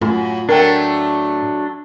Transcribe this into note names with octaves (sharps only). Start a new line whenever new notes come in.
F#2 A2 F4 G#5 B5
F#3 A3 D4 A#4 G5